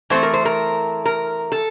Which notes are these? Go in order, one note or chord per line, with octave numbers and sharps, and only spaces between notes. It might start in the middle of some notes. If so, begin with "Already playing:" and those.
E3 A3 C4 C5
A#4
C5
A#4
A#4
A4